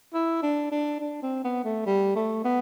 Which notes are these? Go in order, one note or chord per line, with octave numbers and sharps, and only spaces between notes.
E4
D4
D4
D4
C4
B3
A3
G3
A3
B3